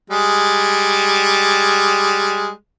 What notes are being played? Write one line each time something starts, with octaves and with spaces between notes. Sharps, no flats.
G3 G#3